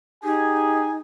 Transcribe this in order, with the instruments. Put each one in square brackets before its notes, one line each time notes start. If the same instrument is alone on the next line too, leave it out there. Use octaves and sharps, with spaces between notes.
[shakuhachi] D#4 [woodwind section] G4 G#4 [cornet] G#5